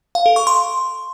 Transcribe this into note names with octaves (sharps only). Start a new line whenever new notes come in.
F5
A4
C#6
C6